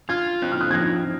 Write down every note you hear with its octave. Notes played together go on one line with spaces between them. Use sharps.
F4 F6 G#6
C4 F#6
F6
D#6 F#6
G#6
F3 F#6 A#6